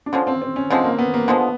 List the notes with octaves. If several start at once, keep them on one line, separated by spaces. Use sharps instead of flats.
D4
D3 F3 G#3 C#4
C4
C4
C#4
D3 F3 G#3 C4
A#3
B3
A#3
D3 F3 G#3 B3